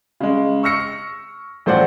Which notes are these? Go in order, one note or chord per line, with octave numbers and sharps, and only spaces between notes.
C#3 G#3
C#6 E6 F6 A#6 C#7
A1 F3 A3 C5 D5 F#5